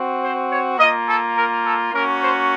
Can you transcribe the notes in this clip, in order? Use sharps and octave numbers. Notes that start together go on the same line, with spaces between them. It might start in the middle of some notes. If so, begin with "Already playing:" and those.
Already playing: C4 F#4
C5
C#5
A#3 F4 D#5
A4
A#4
A4
A#3 C#4 F#4 A#4
C5